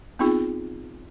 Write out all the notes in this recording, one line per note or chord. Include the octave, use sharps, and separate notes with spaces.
B3 C4 D#4 F4 G#4